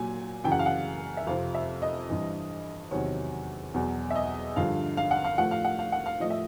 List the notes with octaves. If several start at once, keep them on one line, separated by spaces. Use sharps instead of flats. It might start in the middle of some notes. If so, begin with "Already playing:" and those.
Already playing: A#2 F#3 G#5
F#2 C#3 E3 G5
F#5
F5
F#5
E5
F2 C3 F3 F5
E5
D#5
G2 E3
E2 C3 D#3 F#3 C#5
E2 B2 F#3
E5
D#5
G2 D3 F3 F5
F5
F#5
F5
A2 F3 F#5
F5
F#5
F5
F#5
F5
A2 F3 D#5
E5